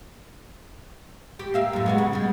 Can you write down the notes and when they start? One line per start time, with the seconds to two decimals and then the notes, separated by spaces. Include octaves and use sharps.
1.39 G4
1.54 A#3 E5 F5
1.73 F#2 A2
1.86 G#3 B3 F#4
1.98 C#3
2.13 G3 G#3